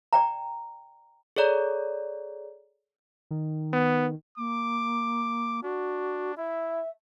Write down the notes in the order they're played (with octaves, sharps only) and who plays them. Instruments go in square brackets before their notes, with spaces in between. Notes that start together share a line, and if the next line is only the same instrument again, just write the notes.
[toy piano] D5 G5 A#5
[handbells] G#4 A4 C#5 D5 A#5
[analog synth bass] D#3
[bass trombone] B3
[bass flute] A#3 [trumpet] D6
[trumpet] D4 [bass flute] F#4
[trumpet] E4 [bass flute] E5